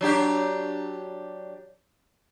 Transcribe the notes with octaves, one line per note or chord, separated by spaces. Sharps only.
F#3 D4 G4